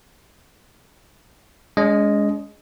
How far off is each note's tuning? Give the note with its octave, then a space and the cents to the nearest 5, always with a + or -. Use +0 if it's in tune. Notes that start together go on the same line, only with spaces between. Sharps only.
G#3 +0 C#4 +45 D#5 +0